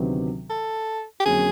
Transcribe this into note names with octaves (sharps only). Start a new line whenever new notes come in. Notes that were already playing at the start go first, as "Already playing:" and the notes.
Already playing: D2 C3 D#3 F#3 B3
A4
G4
F2 D3 F#3 A#3 C#4 G#4